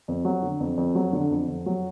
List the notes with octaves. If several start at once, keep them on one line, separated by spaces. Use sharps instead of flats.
F2
F#3
D3
F2
F2
F#3
D3
F2
F2
F#3